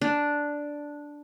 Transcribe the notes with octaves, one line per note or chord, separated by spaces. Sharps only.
D4